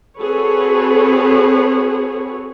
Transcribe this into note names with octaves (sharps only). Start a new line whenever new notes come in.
C4 F#4 G#4 A4 B4 C#5